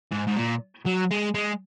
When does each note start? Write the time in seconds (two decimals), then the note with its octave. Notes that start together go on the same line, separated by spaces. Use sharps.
0.11 G#2
0.27 G#2
0.36 A#2
0.86 F#3
1.11 G#3
1.35 G#3